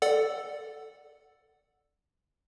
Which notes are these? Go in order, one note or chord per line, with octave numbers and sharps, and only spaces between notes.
A4 D5 F#5